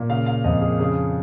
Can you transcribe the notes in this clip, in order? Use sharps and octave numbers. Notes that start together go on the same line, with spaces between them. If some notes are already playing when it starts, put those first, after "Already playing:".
Already playing: A#2
C#3 F5
F5
F2 D#5
G#4
C#3 G#4